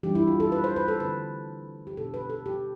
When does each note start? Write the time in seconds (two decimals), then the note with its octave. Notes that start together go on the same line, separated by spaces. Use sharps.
0.03 E3 G3 D4 G4
0.15 E4
0.28 F4
0.40 A4
0.52 B4
0.64 C5
0.76 B4
0.88 A4
1.00 D3 A3 C4 B4
1.87 G4
1.97 B2 B3 D4 A4
2.14 B4
2.30 A4
2.46 G4